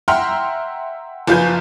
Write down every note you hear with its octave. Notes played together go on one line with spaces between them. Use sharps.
E5 F#5 G5 A#5 C6 F6
F#1 F3 F4 B4 G#5 G6